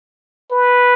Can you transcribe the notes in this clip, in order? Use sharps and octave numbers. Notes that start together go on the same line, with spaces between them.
B4